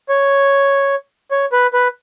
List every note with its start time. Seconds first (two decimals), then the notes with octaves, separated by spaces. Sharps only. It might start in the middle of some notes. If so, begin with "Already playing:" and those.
0.09 C#5
1.31 C#5
1.52 B4
1.73 B4